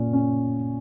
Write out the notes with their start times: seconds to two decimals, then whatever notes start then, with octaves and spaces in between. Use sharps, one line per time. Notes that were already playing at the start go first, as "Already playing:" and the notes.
Already playing: A#2 C#4
0.13 C#4